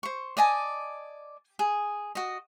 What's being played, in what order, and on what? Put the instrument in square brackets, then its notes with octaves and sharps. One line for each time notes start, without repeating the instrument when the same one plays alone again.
[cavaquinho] C5 C#6
D5 D#5 G#5 A5
G#4
F#4 D#5